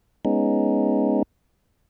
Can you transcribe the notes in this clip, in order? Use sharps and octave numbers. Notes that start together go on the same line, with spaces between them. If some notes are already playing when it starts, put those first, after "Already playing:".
G#3 B3 C#4 D#4